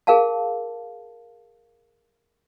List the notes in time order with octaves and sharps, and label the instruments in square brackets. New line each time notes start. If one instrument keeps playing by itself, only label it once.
[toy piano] G#4 A#4 F5 A5